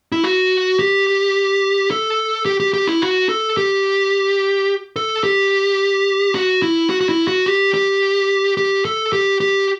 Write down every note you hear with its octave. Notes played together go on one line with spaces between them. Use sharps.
E4
F#4
G4
A4
G4
G4
G4
E4
F#4
A4
G4
A4
G4
F#4
E4
F#4
F#4
E4
F#4
G4
G4
G4
A4
G4
G4